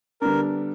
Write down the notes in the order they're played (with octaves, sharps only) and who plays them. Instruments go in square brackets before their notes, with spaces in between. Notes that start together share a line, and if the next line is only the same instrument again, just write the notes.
[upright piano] D3 G3 B3 D4 [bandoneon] A#4